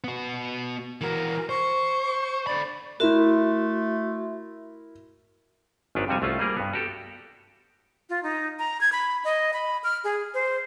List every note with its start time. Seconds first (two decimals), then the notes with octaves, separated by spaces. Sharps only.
0.04 B3 F#4
1.01 E3 F#4 A#4
1.49 C5 C#6
2.47 D3 D5 B5
3.00 A3 E4 F#4 A#4 E5 C6
5.95 G#1 F#2 D#3 D4 B4 C#5
6.08 F2 C3 G3 F#4 C#5 G#5
6.22 C2 A3 C#4 F4
6.39 G3 A#3 G#4 A#4
6.57 G2 B3
6.74 F#4 G4 A4
8.09 F4
8.23 D#4
8.59 A#5
8.81 G#6
8.92 B5
9.25 D#5
9.53 B5
9.84 F6
10.04 G#4
10.34 C5